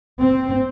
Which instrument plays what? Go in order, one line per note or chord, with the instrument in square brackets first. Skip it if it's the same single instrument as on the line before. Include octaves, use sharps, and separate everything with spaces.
[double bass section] C4